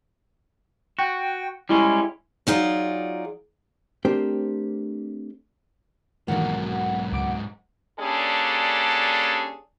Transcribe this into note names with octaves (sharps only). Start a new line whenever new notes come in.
F#4 G5
G3 G#3 C#4 E4
F#3 D#4 F4 G#4 D5
A3 C4 D4 G4 A#4 C5
B1 G#2 D#3 E3 F#3 G#3 A#3 F#5
C#2 D6 D7
G3 A#3 C#4 D4 G#4 A4